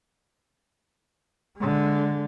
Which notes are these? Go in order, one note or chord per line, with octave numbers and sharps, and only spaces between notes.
D3 G#3